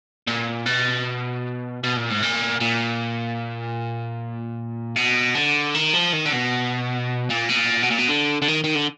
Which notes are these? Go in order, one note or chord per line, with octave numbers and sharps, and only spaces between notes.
A#2
B2
B2
A#2
G#2
A#2
A#2
B2
D3
D#3
F3
D#3
D3
B2
A#2
B2
A#2
B2
A#2
B2
D3
D3
D#3
D#3
D3